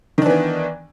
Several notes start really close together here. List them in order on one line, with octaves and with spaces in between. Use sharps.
D#3 D4 E3 B3